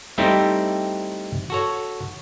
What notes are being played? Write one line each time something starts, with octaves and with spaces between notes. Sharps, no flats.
G3 A3 C4 D#4 E4 G4
F#4 A4 C#5